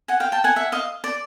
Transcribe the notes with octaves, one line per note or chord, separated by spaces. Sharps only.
F#5 G#5
F5 G5
G5 A5
F#5 G#5
E5 F#5
D#5 F5
D5